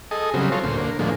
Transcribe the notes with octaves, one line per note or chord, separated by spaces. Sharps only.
G#4 A4 D#5
C#3 F#3 G3 C4
F4 A4 C5 C#5
D2 A#2 C5
D3 A#3
A2 D3 F3 G#3 A#3